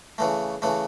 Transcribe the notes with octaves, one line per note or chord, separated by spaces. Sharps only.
C#3 E3 A3
C#3 E3 A3